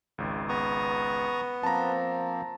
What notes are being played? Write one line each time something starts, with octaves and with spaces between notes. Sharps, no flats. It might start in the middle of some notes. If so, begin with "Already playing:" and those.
G#1 C#2
B3 A#5 C#6 D#6
F3 A#3 C4 A5 A#5